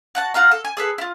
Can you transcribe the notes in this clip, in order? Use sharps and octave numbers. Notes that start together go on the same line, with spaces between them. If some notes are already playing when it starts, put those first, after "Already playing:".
F#4 F#5 A5
F4 F#4 F5 A#5
A4
G#5
G#4 A4 B4
E4 F4